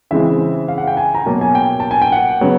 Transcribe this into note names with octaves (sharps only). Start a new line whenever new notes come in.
C#3 E3 G#3 C4 E5
F5
F#5
G5
G#5
A#5
B2 F#3 A#3 A5
G#5
G5
A5
G#5
G5
F#5
C#3 F#3 B3